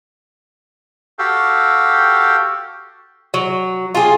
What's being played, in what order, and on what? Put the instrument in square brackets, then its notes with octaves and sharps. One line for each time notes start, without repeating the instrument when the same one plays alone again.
[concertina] F#4 G4 A4 F5 G5
[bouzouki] F#3
F4 G4 G#4